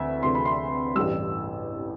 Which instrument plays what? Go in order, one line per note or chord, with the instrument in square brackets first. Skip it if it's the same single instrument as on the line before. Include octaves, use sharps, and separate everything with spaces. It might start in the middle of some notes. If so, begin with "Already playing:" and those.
Already playing: [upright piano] D2 C3 E3 E5
D2 C3 E3 C6
B5
C6
A1 G2 E3 G3 E6